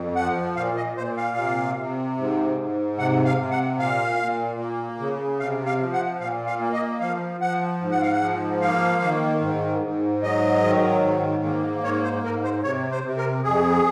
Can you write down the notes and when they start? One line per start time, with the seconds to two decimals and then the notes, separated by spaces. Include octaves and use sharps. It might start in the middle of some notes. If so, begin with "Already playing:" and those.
Already playing: F2
0.16 F3 F#5
0.56 A#2 F5
0.77 D#5
0.97 A#2 C5
1.17 F5
1.37 C3
1.77 C3
2.18 G#2
2.58 G#2
2.98 C3 F#5
3.25 F5
3.38 C3
3.51 F#5
3.78 A#2 F5
4.19 A#2
4.59 A#3
4.99 C#3
5.40 C3 F5
5.66 F5
5.80 F3
5.93 F#5
6.20 A#2 F5
6.47 F5
6.60 A#3
6.73 D#5
7.01 F3 F5
7.41 F3 F#5
7.81 G#2
7.91 F#5
8.02 F5
8.12 F#5
8.21 F3
8.61 A#3 F5
9.02 D#3
9.41 G#2
9.82 G#2
10.22 F#3 D#5
10.63 D#3
11.04 G#2
11.43 A#3
11.84 G#2 C#5
12.03 C5
12.23 G#2 A#4
12.44 C5
12.63 C3 C#5
12.91 C5
13.04 C3
13.17 A#4
13.44 F2 G#4